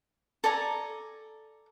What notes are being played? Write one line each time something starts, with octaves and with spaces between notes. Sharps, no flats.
A4 D5 G#5 A#5